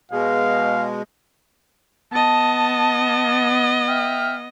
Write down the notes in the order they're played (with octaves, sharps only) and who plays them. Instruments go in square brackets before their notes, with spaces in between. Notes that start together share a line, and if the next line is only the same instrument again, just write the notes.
[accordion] B2 G#3 [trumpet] F5
[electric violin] B3 D#5 [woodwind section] A5
[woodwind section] E5 G5 F6